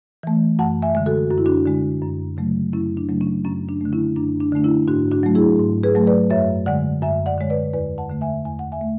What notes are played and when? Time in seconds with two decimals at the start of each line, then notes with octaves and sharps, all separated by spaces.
0.23 E3 A3
0.59 F#2 F#5 A5
0.82 E5 G#5
0.95 D3 G#3
1.06 F#4 A4
1.31 F#2 F#4
1.38 E4
1.46 D4 F#4
1.66 D3 G#3
2.02 F#2
2.37 C#3 F#3 A3
2.73 F#2 C#4 E4
2.97 D4
3.09 C#3 F#3 A3
3.21 C#4
3.45 F#2 C#4
3.69 D4
3.81 D3 A3
3.93 C#4 E4
4.16 F#2 D4
4.40 D4
4.52 D3 A3 D4
4.64 C#4 E4
4.88 G#2 D4 F#4
5.11 D4 F#4
5.23 F#3 A3
5.35 E4 G#4
5.60 G#2
5.83 G#4 B4
5.95 F#3 A3
6.07 B4 D5
6.30 F#2 C#5 E5
6.66 D3 G#3 D5 F#5
7.02 F#2 E5 G#5
7.26 D5 F#5
7.38 D3 G#3 C#5
7.50 B4 D5
7.73 E2 B4 D5
7.98 F#5 A5
8.09 D3 A3
8.21 E5 G#5
8.45 E2 G#5
8.59 F#5
8.72 E5 G#5
8.81 A3